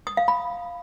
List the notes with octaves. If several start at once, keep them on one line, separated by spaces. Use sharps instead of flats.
D#6
F5
B5